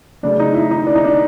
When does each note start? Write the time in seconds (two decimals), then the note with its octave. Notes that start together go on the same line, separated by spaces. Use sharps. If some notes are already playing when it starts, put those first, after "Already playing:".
0.23 C#3 F#3 A3 D4
0.39 D#4
0.54 E4
0.71 D#4
0.87 D4
0.96 D#4
1.05 D4